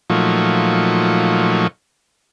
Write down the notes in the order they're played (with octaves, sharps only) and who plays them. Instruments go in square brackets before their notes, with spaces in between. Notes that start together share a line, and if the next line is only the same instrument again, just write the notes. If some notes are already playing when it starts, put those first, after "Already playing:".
[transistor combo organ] A#2 F3 F#3 A3 D#4 C#6